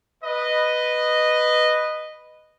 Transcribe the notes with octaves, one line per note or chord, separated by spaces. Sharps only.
B4 D#5